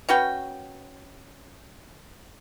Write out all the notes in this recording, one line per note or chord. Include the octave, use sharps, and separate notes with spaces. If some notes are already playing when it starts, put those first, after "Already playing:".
C#4 F#4 B4 G5